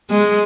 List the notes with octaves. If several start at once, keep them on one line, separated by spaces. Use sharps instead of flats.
G#3